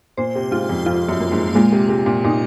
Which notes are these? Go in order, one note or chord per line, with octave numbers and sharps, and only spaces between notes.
A#2 C5
C3
G#2 F4
F2
F2 F4
F#2
A#3
G#2
A#2 G#3
C3
C3 G#3
A#2
A#2 D#4